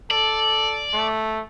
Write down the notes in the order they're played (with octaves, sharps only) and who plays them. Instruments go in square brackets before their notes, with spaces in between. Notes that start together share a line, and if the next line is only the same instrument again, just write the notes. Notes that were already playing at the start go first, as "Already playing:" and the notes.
[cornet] A4 [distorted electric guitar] D5
[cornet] A3